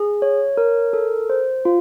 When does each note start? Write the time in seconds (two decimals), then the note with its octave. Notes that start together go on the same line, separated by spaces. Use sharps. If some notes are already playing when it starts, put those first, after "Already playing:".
Already playing: G#4
0.22 C#5
0.57 A#4
0.93 A4
1.30 C5
1.65 F4